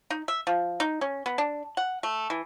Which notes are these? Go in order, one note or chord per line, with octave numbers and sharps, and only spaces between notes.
D#4
E5
F3
D#4
C#4
B3
D4
F#5
A3
E3